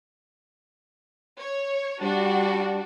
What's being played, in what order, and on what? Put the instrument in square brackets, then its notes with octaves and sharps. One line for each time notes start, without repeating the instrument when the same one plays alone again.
[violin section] C#5
[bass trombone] G3 [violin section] D4 F#4